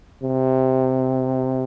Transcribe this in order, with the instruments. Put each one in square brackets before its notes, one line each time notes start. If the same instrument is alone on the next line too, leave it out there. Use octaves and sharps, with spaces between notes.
[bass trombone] C3